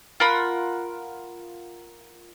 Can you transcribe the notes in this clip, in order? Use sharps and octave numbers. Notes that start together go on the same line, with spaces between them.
F4 A#4 F#5 B5